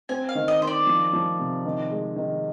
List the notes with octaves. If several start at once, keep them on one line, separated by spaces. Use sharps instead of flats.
C4 G#5
F5
D#3
D#5
D#3 C5
D5
F3
F3
C3
D#3
G#3
D#3